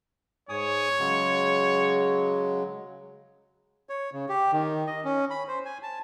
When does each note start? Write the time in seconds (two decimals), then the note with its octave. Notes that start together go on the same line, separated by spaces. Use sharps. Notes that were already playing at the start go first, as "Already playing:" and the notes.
0.49 G#2 C#5 G#5 D#6
0.99 C#3 F#3 G#3
3.89 C#5
4.13 C#3
4.29 G4
4.52 D#3
4.87 D#5
5.05 C#4
5.30 B5
5.48 C5
5.65 G#5
5.83 A5